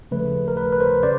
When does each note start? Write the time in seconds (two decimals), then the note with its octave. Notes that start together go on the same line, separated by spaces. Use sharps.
0.11 C#3 F3 A3 B4
0.48 A#4
0.57 B4
0.72 B4
0.80 A#4 C5
1.03 C#3 C5 D5